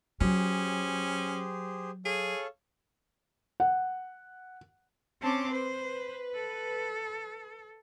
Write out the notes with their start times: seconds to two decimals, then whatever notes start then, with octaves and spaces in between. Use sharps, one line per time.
0.21 F#3 C#4 G4 G#4 C5
2.05 G#4 A4 C#5 F5
3.60 F#5
5.21 C4 C#4 A5 C6 D6
5.52 B4 C5
6.35 A4